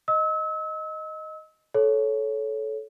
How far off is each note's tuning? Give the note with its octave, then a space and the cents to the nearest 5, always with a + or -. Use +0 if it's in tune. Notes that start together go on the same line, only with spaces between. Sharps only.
D#5 +0 E6 -35
A4 -15 C#5 +0